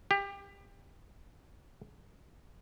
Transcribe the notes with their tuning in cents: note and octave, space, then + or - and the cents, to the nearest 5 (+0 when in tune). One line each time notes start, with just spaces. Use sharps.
G4 +25